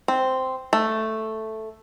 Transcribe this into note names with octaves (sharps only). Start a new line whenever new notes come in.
C4
A3